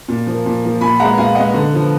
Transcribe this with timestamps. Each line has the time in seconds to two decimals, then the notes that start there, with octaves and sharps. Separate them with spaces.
0.08 A#2
0.27 F3 A#3
0.46 A#2
0.64 F3 A#3
0.81 A#2 G#5 B5
0.99 G#3 B3 F#5 A#5
1.18 A#2 F5 G#5
1.35 G#3 B3 D#5 F#5
1.54 D3
1.72 F3 B3